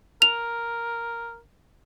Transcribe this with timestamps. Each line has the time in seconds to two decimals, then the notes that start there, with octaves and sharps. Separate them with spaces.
0.22 A#4 F7